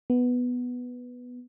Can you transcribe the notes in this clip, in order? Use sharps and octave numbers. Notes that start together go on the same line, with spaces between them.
B3